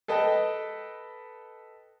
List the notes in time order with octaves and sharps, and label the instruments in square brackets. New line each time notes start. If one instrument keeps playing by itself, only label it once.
[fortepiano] A4 B4 D#5 G5 A5